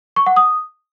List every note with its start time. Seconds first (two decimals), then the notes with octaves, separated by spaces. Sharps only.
0.16 C#6
0.26 F#5
0.36 D#6